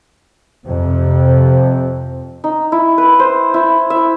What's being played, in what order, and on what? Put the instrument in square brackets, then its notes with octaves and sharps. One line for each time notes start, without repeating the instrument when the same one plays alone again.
[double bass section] F2 C3 F3
[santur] D#4
E4
B4
C5
E4
E5